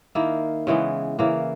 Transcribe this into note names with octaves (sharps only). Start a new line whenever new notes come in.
D#3 A#3 E4
C#3 E3 G#3 B3
C#3 E3 A#3